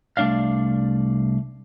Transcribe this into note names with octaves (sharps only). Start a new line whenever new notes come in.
C2 A3 D4 D5 F5